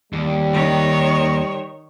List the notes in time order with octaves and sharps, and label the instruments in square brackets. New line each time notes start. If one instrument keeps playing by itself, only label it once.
[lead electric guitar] D#2 [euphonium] G3
[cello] D#3 C#5